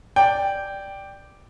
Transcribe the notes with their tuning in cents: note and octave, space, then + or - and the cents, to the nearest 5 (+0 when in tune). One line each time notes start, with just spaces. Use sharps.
D5 +0 G5 +0